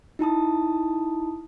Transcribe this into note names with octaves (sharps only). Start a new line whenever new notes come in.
D#4 E4 A5 D#6